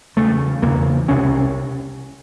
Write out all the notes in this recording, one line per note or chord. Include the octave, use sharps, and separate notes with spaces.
E2 C#3 A3
E2 C#3 A#3
C2 C3 C#4